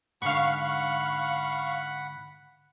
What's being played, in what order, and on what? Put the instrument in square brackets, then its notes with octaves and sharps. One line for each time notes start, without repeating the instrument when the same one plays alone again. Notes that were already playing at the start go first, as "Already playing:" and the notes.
[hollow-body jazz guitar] G#2 D3 [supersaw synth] F5 C#6 [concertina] F#5 B5